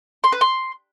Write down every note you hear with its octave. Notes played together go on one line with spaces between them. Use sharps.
C6
B4
C6